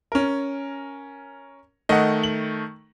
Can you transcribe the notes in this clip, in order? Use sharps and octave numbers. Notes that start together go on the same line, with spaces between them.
C#4 A#4
D#3 A3 D#5 F#5
F#7